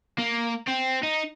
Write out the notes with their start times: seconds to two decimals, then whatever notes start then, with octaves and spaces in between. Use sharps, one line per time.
0.18 A#3
0.68 C4
1.03 D#4